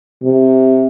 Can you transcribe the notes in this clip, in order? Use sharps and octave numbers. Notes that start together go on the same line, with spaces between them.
C3